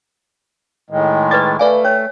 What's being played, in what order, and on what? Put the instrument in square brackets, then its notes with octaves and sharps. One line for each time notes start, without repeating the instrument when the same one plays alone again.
[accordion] A2 D#3 G#3
[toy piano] B4 D5 D6 [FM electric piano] A6
[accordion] A3 [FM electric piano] B4 D5 F5 [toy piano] G#5
[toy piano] C#5 [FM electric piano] G5